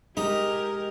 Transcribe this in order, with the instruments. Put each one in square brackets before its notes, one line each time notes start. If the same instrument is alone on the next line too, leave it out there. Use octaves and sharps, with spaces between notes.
[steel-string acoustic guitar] G#3 [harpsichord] D#4 [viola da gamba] G4 A#4